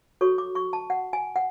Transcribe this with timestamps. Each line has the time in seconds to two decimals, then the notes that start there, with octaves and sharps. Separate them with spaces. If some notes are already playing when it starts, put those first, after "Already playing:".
0.21 F#4 A4 C#5 C#6
0.38 D6
0.55 C#6
0.73 A5
0.90 F#5
1.13 G#5
1.36 F#5